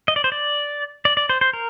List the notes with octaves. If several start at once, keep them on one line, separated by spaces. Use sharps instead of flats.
D#5
D5
C5
D5
D5
D5
C5
C5
A#4